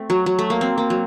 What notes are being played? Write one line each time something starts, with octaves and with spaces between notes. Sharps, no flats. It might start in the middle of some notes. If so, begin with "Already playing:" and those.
Already playing: A3 C4
F#3
F#3
A3
A#3
C4
A#3
F#3